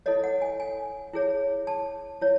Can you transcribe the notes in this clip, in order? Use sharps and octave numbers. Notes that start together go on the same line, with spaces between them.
E4 A4 C#5 D#5
F#5
G#5
G#5
E4 G#4 C#5
A5
E4 C#5